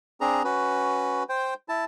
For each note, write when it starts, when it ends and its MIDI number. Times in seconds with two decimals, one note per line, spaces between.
0.21 0.43 60
0.21 0.43 62
0.21 0.43 68
0.21 0.43 82
0.44 1.23 61
0.44 1.23 66
0.44 1.23 71
1.29 1.54 72
1.29 1.54 79
1.69 1.85 64
1.69 1.85 81